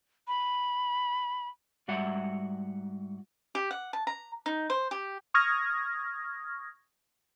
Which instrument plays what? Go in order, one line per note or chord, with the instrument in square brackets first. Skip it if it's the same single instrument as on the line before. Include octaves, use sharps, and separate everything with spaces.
[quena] B5
[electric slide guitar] G#2 G3 F#4 E5 F#5
[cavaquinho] G4
F#5
A5
A#5
D#4
C5
G4
[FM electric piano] C#6 D#6 F6 G#6 A#6